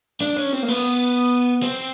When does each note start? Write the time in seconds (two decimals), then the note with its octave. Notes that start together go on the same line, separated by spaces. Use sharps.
0.22 D4
0.38 C#4
0.53 C4
0.63 A#3
0.68 B3
1.63 C4